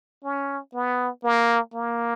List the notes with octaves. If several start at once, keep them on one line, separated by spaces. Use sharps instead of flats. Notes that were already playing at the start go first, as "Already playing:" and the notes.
C#4
B3
A#3
A#3